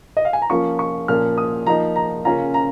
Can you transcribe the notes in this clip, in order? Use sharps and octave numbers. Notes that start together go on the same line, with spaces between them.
D#5
F5
G#5
A#5
F3 A#3 C#4 F4 C#6
C#6
A#2 F3 A#3 C#4 F4 F6
D#6
F3 A#3 D#4 A#5
A#5
C#3 A#3 C#4 F4 A#5
A#5